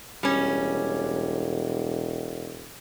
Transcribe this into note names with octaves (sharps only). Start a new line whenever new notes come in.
E1 G3 C#4